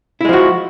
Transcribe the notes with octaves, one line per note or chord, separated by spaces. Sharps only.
F3 G#3 E4 F#4